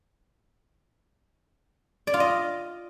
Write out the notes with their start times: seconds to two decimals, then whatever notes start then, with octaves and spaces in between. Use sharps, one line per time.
2.07 D5
2.14 F4
2.20 D#5